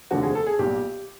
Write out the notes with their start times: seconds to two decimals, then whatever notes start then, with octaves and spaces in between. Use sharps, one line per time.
0.11 F1 D#2 D3 F3 A3 F#4
0.23 G#4
0.35 A4
0.46 G#4
0.59 B1 A#2 G3 G4